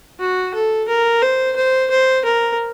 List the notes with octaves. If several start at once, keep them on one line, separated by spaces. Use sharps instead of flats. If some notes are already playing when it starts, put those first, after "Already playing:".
F#4
A4
A#4
C5
C5
C5
A#4